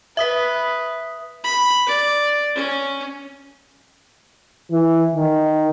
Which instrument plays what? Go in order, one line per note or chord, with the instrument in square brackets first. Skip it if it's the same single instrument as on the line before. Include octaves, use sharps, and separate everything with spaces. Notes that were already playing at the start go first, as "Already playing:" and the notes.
[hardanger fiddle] B4 [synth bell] E5 D#6 B6
[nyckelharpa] B5
D5
C#4
[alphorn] E3
D#3